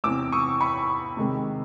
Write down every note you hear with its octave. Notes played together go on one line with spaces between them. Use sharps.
E2 C3 E3 D6 E6
C#6 D#6
B5 C#6
C3 D#3 G#3